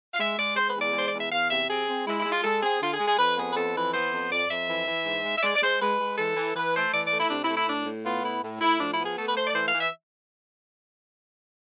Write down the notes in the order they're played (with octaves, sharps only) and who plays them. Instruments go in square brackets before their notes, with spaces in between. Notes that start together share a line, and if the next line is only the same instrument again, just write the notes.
[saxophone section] F5
G#3 E5
G#3 D5
G#3 C5
B4
E2
D5
G#3 C5
D5
E2
E5
E2 F5
C3 E5
C4 G#4
C4
G#3 E4
E4
G#3
F4
G#3 A4
C4 G#4
D3 F4
G#4
G#3
G#4
F2 B4
B3 G#4
B4
F2 A4
E3 B4
B3 C5
F2
F2 D5
F2 E5
E3
E3
G#2
G#3
E5
G#3 D5
D5
G#3 C5
G#3 B4
G#3
E3 A4
E3
E3 B4
A3 C5
E3 D5
D5
A3
E4
C3 D4
E4
A3
E4
A2 D4
A2
B3 F4
A2 E4
A2
A2 E4
F3 D4
E4
B3
G#4
A3 A4
B4
A3 C5
D5
E3 C5
F5
E3
E5